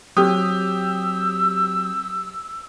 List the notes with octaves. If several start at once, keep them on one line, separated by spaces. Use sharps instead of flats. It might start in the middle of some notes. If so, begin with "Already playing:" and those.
F#3 C4 G4 D#6 E6